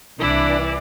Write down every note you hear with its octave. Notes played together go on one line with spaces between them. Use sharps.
C2 E3 D4 E4 D5